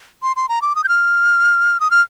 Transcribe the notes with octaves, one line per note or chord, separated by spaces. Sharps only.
C6
C6
A#5
D6
D#6
G6
F6
D#6
F6